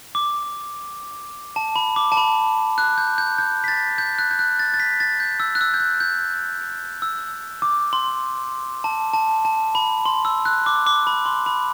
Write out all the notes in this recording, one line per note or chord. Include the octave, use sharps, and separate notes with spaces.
D6
A5
B5
D6
A5
B5
F#6
G6
G6
G6
B6
A6
G6
F#6
G6
F#6
A6
A6
B6
A6
G6
E6
F#6
E6
G6
F#6
G6
E6
D6
C6
A5
A5
A5
B5
C6
E6
F#6
D6
D6
B5
C6
B5